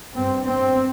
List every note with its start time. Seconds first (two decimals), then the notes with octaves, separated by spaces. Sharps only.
0.13 G2 C4
0.44 C4